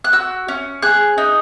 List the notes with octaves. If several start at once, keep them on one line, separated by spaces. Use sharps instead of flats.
F#6
F#4 E6
C#4
G#4 F#6
D#4